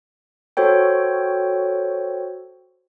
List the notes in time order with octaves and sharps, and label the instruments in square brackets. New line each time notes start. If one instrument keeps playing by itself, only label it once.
[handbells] F#4 A4 C5 C#5 G5